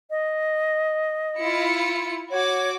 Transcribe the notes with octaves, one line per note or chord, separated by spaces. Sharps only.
D#5
E4 F4 C#7
F#4 C#5 D6